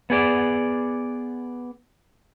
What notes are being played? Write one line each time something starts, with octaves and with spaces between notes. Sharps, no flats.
B3 G#4 D5